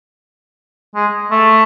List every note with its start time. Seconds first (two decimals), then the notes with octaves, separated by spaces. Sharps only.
0.95 G#3
1.31 A3